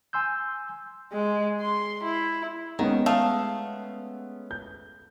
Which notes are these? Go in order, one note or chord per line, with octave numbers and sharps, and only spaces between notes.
G#5 C6 E6 G6
G#3
C6
E4
D#3 G#3 B3 C#4
A3 F5 D#6
G6